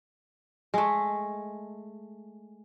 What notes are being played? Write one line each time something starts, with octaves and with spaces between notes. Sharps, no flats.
G#3 A3